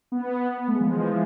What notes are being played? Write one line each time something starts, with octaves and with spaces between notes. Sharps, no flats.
B3
B3
A3
G#3
F3
E3